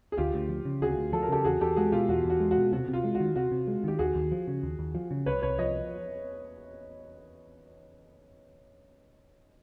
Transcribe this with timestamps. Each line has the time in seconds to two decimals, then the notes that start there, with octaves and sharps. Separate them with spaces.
0.12 G#4
0.17 D2 F4 G4
0.34 D2
0.49 F3
0.65 C#3
0.82 D2 F#4 G#4
0.97 D2
1.13 F3 A4
1.22 A#4
1.29 C#3 G4 A4
1.44 E2 F#4 G#4
1.61 E2 G4 A4
1.76 G#3 F#4 G#4
1.92 B2 F4 G4
2.09 E2 F#4
2.25 E2
2.30 F#4
2.40 G#3
2.51 F#4
2.57 B2
2.73 C3 F#4
2.88 C3
2.93 F4
3.04 G#3
3.15 F#4
3.20 D#3
3.36 C3 F#4
3.52 C3
3.67 G#3
3.84 D#3 G4
3.99 D#2 F#4 G#4
4.15 D#2
4.32 F3
4.48 C#3
4.63 D#2
4.79 D#2
4.95 F3
5.11 C#3
5.26 C2 B4 C#5
5.42 C2 B4 C#5
5.59 F3 C#5 D#5